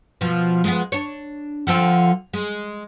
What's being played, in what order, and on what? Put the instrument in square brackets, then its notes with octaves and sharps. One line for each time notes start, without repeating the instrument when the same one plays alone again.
[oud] B2 F3
G#3 A3 B3
D4 C#5
D3 F3 C4
G#3